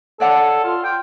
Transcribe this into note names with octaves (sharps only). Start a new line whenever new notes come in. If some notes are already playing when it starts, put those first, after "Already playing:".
A4 C#5 D5 F#5
F4
G5